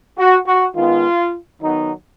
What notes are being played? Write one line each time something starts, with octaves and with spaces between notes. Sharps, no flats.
F#4
F#4
D#3 G#3 B3 F4
D#3 F#3 B3 D#4